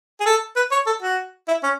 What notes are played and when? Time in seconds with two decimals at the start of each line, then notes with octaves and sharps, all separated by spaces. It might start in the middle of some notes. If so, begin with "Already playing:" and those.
0.20 G#4
0.26 A4
0.56 B4
0.71 C#5
0.87 A4
1.02 F#4
1.48 E4
1.63 C#4